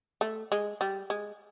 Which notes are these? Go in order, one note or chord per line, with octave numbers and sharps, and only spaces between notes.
A3
G#3
G3
G#3